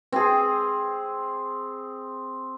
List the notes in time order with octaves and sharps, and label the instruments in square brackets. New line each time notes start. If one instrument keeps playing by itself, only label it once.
[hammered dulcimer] C4 G#4